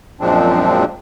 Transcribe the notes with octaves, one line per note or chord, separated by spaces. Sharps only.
F#2 A#2 F3 G#3 C4 D4